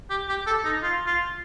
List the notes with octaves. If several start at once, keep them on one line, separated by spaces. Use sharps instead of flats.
G4
G4
A4
D#4
F4
F4